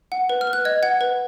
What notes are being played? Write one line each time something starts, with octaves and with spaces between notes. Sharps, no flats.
F#5
B4
F6
B4
F#6
D#5 G#6
F#5 G#6
B4